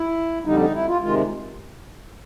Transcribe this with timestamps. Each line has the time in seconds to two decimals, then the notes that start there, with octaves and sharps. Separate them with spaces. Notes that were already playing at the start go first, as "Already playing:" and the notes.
Already playing: E4
0.45 F2 D3 G3 D#4
0.60 D#4
0.74 E4
0.88 F4
1.01 C3 D#3 G#3 F4